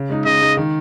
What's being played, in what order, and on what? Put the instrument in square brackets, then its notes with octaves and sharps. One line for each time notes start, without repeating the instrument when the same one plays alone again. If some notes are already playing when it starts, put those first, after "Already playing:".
Already playing: [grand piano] C#3
G#3 D#4
[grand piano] C#3 [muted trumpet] D#5
[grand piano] G#3 D#4
D#3